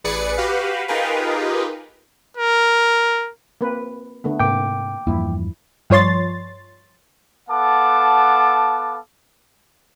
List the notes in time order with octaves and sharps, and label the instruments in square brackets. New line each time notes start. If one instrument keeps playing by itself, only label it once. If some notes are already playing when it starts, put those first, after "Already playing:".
[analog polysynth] A1 G#4 B4 D5 C#7
F#4 G4 B4 F5
D#4 F4 G4 G#4 A#4 B4
[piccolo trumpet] A#4
[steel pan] A#3 C4 B4
D3 A3 B3
[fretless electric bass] G#2 C3 [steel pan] A#3 [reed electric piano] G5 D6
[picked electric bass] E2 G2 F3 [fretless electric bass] A#3 [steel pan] E4
[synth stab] G2 F3 C#5 C6 A6
[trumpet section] B3 A4 F5 F#5 A5 D6